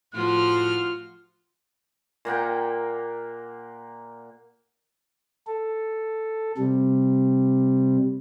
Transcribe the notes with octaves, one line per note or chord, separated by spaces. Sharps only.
A2 F3 F4 F#4 F6
A#2 A#3 F#5 G5
A4
C3 G3